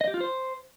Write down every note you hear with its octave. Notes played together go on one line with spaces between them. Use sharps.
D#5
G4
F4
C5